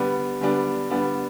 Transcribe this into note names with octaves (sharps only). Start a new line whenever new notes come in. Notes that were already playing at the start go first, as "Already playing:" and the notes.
Already playing: D3 G3 B3 D4
D3 G3 B3 D4
D3 G3 B3 D4